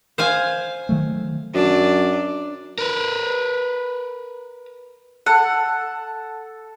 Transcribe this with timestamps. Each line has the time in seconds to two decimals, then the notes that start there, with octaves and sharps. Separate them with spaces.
0.18 C5 F5 G#5
0.89 D#3 F#3 A3
1.54 F#2 D4
2.78 A#4 B4
5.26 A4 F#5